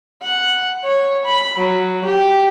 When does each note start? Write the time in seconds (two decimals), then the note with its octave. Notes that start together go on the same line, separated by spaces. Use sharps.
0.22 F#5
0.84 C#5
1.25 B5
1.58 F#3
2.05 G4